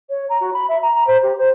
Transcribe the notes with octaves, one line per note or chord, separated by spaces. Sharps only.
C#5
A#5
F#4
B5
E5
A#5
A#5
C5
G4
C5